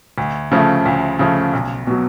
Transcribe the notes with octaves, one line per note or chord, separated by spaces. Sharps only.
D2
C#3 F3 A3
D2
C#3 F3 A3
B1
B2 F#3